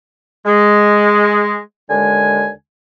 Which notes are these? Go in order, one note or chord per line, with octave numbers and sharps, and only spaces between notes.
G#3
D#2 D3 G#3 G#5